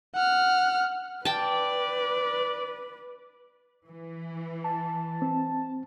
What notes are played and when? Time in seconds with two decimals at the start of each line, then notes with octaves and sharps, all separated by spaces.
0.14 F#5 F6
1.25 B4 D5 G5 A5
3.88 E3
4.64 A5
5.22 C4